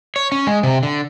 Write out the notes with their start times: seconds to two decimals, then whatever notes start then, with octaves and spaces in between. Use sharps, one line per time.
0.16 C#5
0.32 C#4
0.47 G#3
0.63 C3
0.83 D3